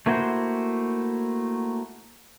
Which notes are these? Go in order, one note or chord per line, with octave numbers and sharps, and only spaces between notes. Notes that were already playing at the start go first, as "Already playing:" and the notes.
A3 A#3 E4 F#4 C5